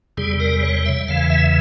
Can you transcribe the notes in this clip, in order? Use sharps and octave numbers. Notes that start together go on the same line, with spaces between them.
E2 C3 G3 G#4
A#4
C#5
E5
E2 C#3 E3 F5
E5